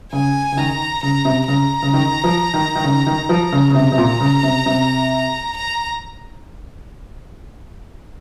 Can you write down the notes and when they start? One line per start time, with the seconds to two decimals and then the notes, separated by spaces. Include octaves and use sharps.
0.12 C#3 G#5
0.52 C#3
0.57 D#3 A#5
1.03 C#3 A#5
1.25 C3
1.48 C#3 A#5
1.82 C#3
1.94 D#3
2.24 F3
2.54 D#3
2.75 D#3
2.84 C#3
3.07 D#3
3.29 F3
3.52 C#3
3.70 C#3
3.75 C3 A#5
3.92 C3
3.98 A#2
4.20 C#3
4.43 C3
4.66 C3
5.56 A#5